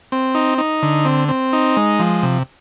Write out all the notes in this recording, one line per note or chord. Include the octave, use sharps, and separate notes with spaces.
C4
D#4
D#4
D3
C4
C4
D#4
G#3
F3
C3